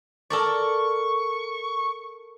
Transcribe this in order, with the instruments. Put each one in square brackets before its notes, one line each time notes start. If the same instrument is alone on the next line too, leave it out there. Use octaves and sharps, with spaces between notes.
[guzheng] A4 A#4 D5 [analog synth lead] C#6